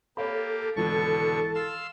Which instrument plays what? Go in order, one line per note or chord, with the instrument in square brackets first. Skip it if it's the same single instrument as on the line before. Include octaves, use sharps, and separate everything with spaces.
[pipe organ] A#3 G4 [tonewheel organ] A4 [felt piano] C#5 F5 B5
[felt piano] G#1 E3 E4 [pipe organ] B2 D3 C#6 [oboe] A5
[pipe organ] F5 C6 E6